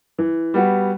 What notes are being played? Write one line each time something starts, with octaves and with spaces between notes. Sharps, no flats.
E3
G3 B3 F#4